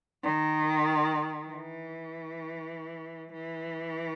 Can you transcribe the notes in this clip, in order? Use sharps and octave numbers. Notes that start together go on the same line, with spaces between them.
D#3
E3
E3